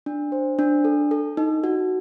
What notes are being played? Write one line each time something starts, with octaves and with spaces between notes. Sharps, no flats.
D4
C5
D4
A4
A4
D#4
F#4